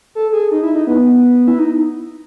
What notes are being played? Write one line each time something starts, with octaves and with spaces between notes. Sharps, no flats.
A4
G#4
D#4
E4
D#4
B3
E4
D#4